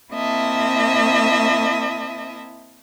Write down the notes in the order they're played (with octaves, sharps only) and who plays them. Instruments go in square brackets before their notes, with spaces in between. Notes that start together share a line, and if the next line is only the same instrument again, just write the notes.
[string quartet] A#3 C4 E4 D#5 E5 A5